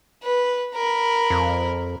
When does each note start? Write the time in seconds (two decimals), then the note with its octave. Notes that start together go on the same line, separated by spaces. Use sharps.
0.23 B4
0.74 A#4 B5
1.30 F2